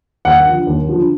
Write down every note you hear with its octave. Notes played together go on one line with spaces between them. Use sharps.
D#2 F#5
D3 F3
D#2
D3 F3